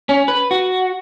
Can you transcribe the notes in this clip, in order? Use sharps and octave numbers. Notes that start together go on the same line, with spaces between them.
C#4
B4
F#4